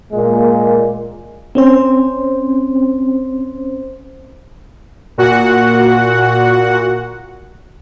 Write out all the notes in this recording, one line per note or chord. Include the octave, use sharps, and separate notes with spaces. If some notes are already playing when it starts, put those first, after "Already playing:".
A#2 G#3 A#3
C4 C#4 C5
A#2 F#4 F#5